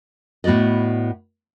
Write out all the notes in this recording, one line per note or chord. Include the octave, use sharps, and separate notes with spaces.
A2 B3 F#4 D5 D#5